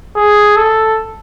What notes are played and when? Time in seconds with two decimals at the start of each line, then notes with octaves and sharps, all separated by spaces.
0.16 G#4
0.56 A4